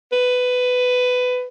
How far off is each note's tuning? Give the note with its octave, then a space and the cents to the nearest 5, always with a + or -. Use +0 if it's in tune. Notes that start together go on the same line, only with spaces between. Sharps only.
B4 +15